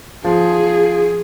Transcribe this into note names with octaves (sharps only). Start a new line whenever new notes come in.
F3 G#4